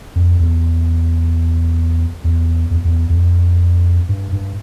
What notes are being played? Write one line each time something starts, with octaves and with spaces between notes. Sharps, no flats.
F2
E2
E2
E2
E2
E2
F2
G2
G2